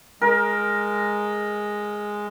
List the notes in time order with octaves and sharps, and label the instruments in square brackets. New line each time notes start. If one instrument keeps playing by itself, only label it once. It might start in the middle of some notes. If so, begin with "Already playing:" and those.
[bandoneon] G#3 [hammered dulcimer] A#4